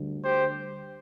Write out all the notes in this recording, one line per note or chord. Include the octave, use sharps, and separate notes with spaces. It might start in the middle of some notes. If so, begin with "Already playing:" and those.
Already playing: D2 D3 G3
G4 C5